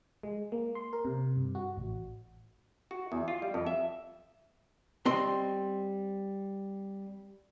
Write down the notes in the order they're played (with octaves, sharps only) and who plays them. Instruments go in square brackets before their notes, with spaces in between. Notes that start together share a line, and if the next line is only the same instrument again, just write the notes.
[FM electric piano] G#3
A#3
C6
A#4
C3
G2
F#4
A1
[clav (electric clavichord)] F#4
E2
F4
G3
F2
E5
[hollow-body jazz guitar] G3 C4 D#5 C6